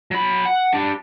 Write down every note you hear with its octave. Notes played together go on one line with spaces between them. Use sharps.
F#3 B5
F#5
D4 G4